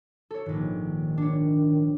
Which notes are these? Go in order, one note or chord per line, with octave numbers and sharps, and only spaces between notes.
A4 C#5
A#1 G#2 D#3
D4 C#5